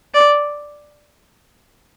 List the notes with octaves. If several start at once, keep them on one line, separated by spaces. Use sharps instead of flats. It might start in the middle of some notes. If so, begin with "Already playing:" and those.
D5